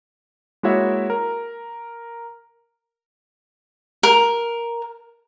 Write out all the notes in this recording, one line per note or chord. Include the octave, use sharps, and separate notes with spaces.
G#3 A#3 E4 F#4 C#5 E5
A#4
A#4